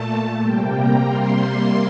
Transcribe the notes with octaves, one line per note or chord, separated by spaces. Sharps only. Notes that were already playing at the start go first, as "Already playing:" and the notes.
Already playing: A#2 A3 A5
A5
C3 G3 A#3 G5
A#5
C3 G3 A#3 C6